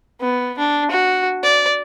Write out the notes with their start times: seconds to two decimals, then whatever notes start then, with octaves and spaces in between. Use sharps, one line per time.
0.21 B3
0.58 D4
0.91 F#4
1.43 D5